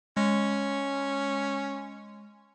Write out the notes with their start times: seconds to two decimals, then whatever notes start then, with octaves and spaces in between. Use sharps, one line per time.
0.17 G#3 C#4